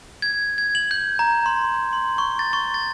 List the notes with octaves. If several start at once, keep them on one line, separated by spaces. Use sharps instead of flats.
G#6
G#6
F#7
G6
A#5
C6
C6
C#6
A6
C#6
A6